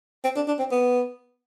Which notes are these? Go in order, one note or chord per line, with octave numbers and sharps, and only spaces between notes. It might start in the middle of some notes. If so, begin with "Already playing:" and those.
C4
D4
D4
C4
B3